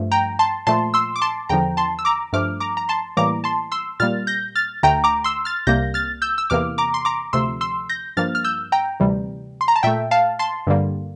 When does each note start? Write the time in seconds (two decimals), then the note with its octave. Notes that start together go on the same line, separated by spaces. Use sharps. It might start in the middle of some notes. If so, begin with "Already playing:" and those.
Already playing: G2 F3 A3
0.12 G5 A#5
0.39 A5 C6
0.67 A#2 F3 A3 A5 C6
0.94 C6 E6
1.16 D6
1.22 A5 C6
1.49 E2 D3 F3 G5 A#5
1.77 A5 C6
1.99 E6
2.05 A#5 D6
2.33 G2 F3 A3 D6 F6
2.60 A#5 D6
2.77 A#5
2.89 A5 C6
3.17 A2 E3 G3 A#3 A#5 D6
3.44 A5 C6
3.72 C6 E6
4.00 A#2 G3 A#3 F6 A6
4.27 G6 A#6
4.55 F6 A6
4.83 D2 D3 A3 G5 A#5
5.04 A#5 D6
5.24 C6 E6
5.45 F6 A6
5.67 C2 C3 G3 A#3 G6 A#6
5.94 F6 A6
6.22 E6 G6
6.38 E6
6.50 E2 C3 E3 A#3 D6 F6
6.78 A#5 D6
6.94 C6
7.05 A#5 D6
7.33 D2 C3 F3 A3 C6 E6
7.61 C6 E6
7.89 G6 A#6
8.17 G2 F3 A#3 F6 A6
8.35 F6
8.44 E6 G6
8.72 G5 A#5
9.00 D2 C3 E3 G3
9.61 C6
9.68 A#5
9.76 A5
9.83 A#2 A3 E5 G5
10.11 F5 A5
10.39 A5 C6
10.67 G2 D3 G3 A#3